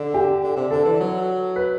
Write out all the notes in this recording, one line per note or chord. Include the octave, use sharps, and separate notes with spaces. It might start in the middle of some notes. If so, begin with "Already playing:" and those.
Already playing: D3
G4
D3
C3
D3 A4
E3
F#3
B4